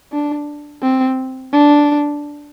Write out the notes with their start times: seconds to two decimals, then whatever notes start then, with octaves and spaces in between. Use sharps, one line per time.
0.12 D4
0.83 C4
1.52 D4